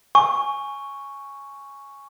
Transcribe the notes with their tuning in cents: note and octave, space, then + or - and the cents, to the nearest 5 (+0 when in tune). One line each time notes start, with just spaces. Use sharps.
G#5 +0 C#6 +0